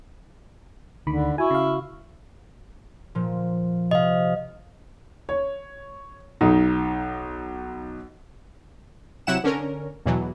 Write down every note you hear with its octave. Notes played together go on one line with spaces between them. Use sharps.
D2 D3 D#3 B5
E4 F#4 G#5 C#6
C#3 F5
A#2 F3
C3 D#5 F5
C#5
B1 D#4
C3 F#3 E4 F#5 E7
D3 C#4 A#4
E2 B2 E3 F#3